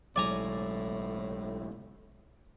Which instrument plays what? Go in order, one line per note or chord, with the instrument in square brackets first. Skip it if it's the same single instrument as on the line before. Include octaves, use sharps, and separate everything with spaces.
[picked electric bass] B1 F#3 G#3 [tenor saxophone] A2 [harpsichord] D5 G#5 A#5